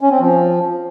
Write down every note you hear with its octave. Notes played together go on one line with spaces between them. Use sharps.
C#4
C4
F3